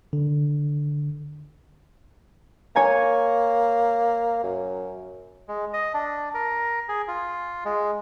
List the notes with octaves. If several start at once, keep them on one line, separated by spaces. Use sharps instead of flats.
D3
A#3 C#5 G#5 A#5
F#2
G#3
D#5
D4
A#4
G#4
F4
G#3